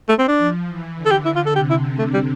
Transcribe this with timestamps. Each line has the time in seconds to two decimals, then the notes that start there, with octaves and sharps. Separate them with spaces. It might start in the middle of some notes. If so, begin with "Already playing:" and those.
0.09 A3
0.19 C4
0.28 D4
0.38 F3
0.67 E3
0.96 D3
1.06 A4
1.11 G4
1.25 E4
1.36 F4
1.46 A4
1.55 C3 G4
1.70 E4
1.99 A3
2.14 G3